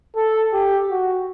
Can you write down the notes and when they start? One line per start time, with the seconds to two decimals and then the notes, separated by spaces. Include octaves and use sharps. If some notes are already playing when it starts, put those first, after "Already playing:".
0.16 A4
0.53 G4
0.90 F#4